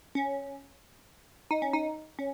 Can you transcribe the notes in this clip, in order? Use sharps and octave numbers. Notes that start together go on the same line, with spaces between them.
C#4
D#4
C#4
D#4
C#4